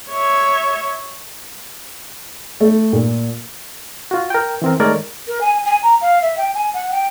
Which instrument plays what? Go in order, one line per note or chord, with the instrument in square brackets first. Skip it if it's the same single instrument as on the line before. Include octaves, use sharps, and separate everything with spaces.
[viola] C#5 E5
[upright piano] A3
A#2
[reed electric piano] F4 F#4
A#4 G5
E3 C4 A#4
D#3 G#3 A3 A#4 C#5 D5
[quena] A#4
G#5
G#5
A#5
F5
E5
G5
G#5
F#5
G5